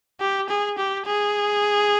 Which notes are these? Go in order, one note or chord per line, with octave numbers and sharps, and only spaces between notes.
G4
G#4
G4
G#4